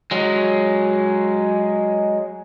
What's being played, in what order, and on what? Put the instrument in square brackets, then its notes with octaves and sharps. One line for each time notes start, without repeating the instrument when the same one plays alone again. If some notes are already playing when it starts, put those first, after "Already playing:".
[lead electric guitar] F#3 G#3